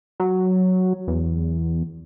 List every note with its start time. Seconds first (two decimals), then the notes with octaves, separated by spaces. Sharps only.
0.20 F#3
1.07 E2